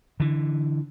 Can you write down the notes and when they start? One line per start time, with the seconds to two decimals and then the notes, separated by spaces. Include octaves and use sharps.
0.20 D3 E3